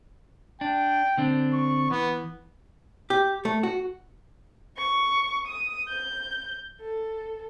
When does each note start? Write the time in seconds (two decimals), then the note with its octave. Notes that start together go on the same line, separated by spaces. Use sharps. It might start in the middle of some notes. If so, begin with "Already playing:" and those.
0.61 D4 G5
1.18 D3 C4 D4
1.53 C#6
1.90 E3 B3
3.10 G4
3.45 A3
3.63 F#4
4.78 C#6
5.47 D#6
5.89 G6
6.81 A4